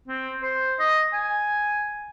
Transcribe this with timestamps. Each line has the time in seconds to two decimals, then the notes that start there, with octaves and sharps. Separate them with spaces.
0.08 C4
0.43 C5
0.80 D#5
1.13 G#5